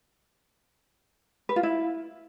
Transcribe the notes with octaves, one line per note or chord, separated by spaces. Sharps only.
B4
F4
E4